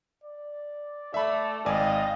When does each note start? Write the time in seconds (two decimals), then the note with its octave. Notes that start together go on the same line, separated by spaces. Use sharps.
0.24 D5
1.14 A3 D5 E5 B5
1.66 G#1 D5 D#5 F5 G5 G#5